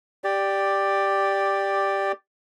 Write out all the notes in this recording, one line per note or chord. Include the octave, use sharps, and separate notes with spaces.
G4 D5